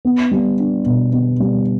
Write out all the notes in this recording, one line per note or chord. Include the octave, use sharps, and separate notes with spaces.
B3
G3
D4
B2
B3
G3